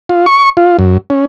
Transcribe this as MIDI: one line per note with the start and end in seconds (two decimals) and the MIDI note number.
0.09 0.26 65
0.26 0.50 85
0.57 0.77 65
0.79 0.98 42
1.10 1.25 61